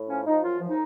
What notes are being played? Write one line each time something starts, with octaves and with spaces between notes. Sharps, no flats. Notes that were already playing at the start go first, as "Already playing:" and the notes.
Already playing: A2
F3 C#4
F3 D#4
F#2 F4
F3
D#4